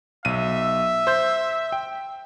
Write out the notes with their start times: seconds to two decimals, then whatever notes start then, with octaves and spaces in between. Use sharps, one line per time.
0.25 B1 E5 D#7
1.07 C5 C6 G6
1.72 G5